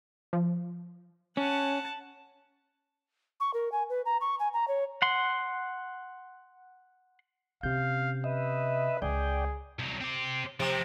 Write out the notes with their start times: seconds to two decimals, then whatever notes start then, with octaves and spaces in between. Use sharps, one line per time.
0.33 F3
1.37 C#4 F#5 A5
3.40 C#6
3.53 A#4
3.72 G#5
3.89 B4
4.05 A#5
4.21 C#6
4.39 G#5
4.53 A#5
4.68 C#5
5.02 F#5 C6
7.63 C3 C#4 F5 G6
8.24 B4 D#5 E5
9.02 C#2 G#4 D5 G5
9.79 C2 F#3
10.01 C4 G4
10.60 C3 F3 G4